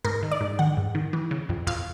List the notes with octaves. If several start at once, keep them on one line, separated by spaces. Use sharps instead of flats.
G#2 A#4
D#3
D5
G#2
D#3 F#5
G#2
D#3
E3
C#3
F2
F2 F5